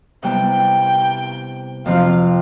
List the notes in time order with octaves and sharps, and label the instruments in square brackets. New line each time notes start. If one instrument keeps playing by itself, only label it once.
[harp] C3 G3 B3 E4 [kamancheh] G5
[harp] F2 C3 F3 C4 F4 [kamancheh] F5